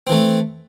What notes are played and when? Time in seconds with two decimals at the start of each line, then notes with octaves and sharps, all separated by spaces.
0.07 C4
0.09 E3
0.12 A3